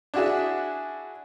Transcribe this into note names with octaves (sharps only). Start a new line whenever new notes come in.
D4 E4 F#4 G#4 E5